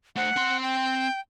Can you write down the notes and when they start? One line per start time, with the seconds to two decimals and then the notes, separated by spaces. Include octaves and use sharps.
0.16 A3 C5 F#5
0.36 C4 C6
0.62 G5